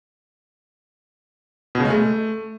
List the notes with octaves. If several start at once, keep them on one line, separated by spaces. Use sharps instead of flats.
B2
C#3
G#3
A3